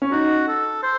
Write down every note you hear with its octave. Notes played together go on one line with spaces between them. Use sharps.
C#4
D#4 F#4
A4
C5